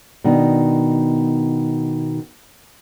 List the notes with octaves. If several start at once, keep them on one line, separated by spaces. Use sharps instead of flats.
B2 D#3 D4